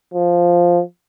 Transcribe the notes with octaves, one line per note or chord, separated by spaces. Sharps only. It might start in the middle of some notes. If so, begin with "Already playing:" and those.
F3